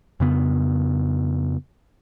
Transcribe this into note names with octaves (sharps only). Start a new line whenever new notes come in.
F2 C#3 B3